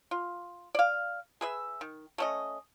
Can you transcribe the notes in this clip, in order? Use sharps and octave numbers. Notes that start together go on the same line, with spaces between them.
F4
D5 F5
G#4 B4 E5
D#3
A3 C#4 D#5